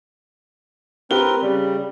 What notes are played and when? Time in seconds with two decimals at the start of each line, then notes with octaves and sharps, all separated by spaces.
1.11 C4 G4 A#4 B4 G7
1.42 C#3 G3